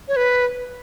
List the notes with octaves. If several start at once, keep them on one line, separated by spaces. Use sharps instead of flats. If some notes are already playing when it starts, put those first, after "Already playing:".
C#5
B4